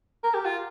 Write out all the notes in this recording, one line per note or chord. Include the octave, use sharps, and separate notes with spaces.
A#4
G4
F4